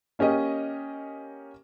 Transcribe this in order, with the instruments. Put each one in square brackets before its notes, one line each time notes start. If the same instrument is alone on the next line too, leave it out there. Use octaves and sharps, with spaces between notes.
[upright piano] A#3 C#4 G4 D#5